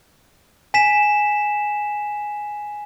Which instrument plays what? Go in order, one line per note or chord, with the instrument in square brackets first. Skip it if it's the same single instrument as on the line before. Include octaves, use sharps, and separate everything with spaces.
[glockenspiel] G#5 B6 E7